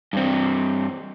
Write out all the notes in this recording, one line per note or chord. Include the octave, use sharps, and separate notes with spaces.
G2 C4